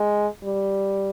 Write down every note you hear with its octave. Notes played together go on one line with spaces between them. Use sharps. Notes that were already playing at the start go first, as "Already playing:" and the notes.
Already playing: G#3
G3